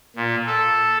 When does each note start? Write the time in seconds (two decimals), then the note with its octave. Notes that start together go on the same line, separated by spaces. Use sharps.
0.16 A#2
0.46 A4